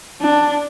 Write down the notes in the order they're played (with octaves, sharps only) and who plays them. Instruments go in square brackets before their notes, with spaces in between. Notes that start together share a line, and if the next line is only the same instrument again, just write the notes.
[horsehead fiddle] D4